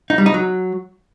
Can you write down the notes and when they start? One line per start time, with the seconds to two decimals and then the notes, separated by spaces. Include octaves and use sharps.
0.10 D#4
0.18 G3
0.26 D#4
0.34 F#3